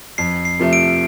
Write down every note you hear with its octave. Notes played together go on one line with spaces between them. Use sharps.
F2 C7
C7
C3 F3 A3
D7